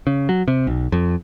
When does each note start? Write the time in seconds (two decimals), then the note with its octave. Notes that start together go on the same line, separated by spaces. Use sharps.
0.07 C#3
0.29 F#3
0.48 C3
0.67 B1
0.92 F2